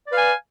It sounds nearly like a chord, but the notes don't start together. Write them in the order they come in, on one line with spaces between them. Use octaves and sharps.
D5 B4 F5 G#5